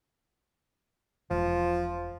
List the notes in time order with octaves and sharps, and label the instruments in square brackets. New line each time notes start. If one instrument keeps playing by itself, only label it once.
[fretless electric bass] E1 [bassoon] F3